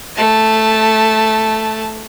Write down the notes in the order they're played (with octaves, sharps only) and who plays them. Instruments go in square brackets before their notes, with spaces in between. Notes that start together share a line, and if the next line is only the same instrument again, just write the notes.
[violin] A3 A5